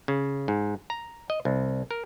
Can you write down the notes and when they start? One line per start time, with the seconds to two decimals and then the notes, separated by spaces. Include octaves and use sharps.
0.08 C#3
0.48 G#2
0.90 A#5
1.30 D#5
1.45 C2
1.91 A#4